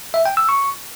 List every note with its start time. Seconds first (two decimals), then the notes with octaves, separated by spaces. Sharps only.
0.14 E5
0.26 G5
0.37 E6
0.49 C#6